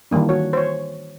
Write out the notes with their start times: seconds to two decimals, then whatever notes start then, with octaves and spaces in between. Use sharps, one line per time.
0.11 D#3 E3 G3 A#3 D4
0.29 F#4 C#5
0.53 C5 C#5